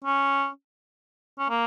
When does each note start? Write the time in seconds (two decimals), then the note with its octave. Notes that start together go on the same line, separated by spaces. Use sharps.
0.04 C#4
1.39 C#4
1.49 A#3